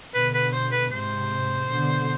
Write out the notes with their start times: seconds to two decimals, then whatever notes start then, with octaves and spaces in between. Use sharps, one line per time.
0.14 B2 D3 B4
0.34 B4
0.53 C5
0.72 B4
0.92 G#2 C3 C5
1.70 B2 D3